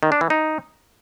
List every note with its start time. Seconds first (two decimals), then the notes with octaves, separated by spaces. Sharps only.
0.03 D#3
0.12 D4
0.21 E3
0.30 D#4